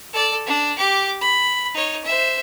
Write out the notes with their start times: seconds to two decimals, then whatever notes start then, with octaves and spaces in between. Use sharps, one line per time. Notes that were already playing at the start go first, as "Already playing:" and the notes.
0.13 A4 D5
0.47 D4
0.76 G4 D6
1.21 B5
1.74 D#4 C#5
2.05 C5 E5